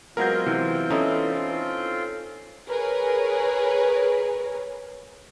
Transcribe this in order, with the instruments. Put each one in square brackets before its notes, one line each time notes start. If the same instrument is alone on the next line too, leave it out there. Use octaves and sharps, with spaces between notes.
[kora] F#3 G#3 B3 [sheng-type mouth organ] C4 F4 [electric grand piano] A#4 G6
[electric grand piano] C3 [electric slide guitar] E3
[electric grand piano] C#4 A4 [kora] D#4 E4
[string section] G#4 A#4 B4 C#5